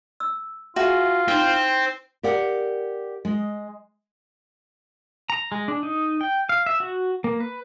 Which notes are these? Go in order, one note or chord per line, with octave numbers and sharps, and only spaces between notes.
E6
F4 F#4 G#4 E5 A5
C4 D#4 E4 G5
G4 A#4 D5 F5 F#5
G#3 D#5
A#5
G#3
D4
D#4
G5
F5
E5
F#4
A#3
B4